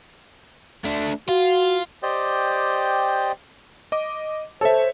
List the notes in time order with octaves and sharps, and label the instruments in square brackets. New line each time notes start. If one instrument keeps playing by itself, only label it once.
[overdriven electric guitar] A3 D4
[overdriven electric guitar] F4 [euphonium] F#4
[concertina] G4 C5 D5 D#5 G5
[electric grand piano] D#5 D6
[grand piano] A4 [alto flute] C5 [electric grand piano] C#5 E5